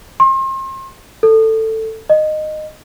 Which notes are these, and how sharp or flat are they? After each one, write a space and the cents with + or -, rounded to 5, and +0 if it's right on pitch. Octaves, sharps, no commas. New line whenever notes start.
C6 +35
A4 +15
D#5 -15